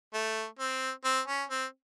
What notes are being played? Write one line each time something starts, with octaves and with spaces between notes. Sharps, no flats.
A3
C4
C4
C#4
C4